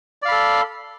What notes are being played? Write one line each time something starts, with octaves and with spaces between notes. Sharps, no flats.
A4 D5 F5 B5